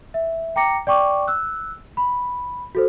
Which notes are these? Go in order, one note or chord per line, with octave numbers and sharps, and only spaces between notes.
E5
G5 A#5 D6 A#6 C#7
D5 G5 C#6 D6
E6 F#6
B5
F#4 A4 C5